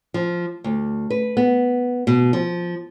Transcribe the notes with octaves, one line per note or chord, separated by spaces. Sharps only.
F3
D2
B4
B3
B2
F3